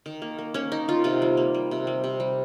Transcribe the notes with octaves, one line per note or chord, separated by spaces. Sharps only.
D#3
A#3
A#3
A#3 C#4
D#3 D#4
D#3 F4
C3 F4
G3
A#3
G3
C3
G3
C3
G3